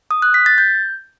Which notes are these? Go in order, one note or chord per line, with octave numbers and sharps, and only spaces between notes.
D#6
F#6
B6
A6
G6